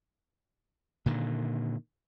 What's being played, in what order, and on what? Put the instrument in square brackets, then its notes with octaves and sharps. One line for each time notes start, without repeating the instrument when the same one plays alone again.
[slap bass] A#2 D3 D#3